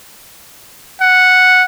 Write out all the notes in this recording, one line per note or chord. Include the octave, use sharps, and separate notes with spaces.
F#5